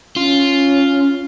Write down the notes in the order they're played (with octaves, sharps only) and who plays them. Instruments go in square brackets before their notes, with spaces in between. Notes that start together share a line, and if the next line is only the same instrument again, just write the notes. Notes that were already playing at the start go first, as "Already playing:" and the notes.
[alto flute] C#4 [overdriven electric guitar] F4